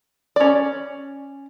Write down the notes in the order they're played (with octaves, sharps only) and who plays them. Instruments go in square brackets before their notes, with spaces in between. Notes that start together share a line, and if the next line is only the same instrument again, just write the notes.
[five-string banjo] C#4 D5